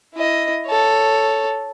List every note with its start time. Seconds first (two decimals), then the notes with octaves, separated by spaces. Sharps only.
0.14 E4 D#5
0.67 A4 C#5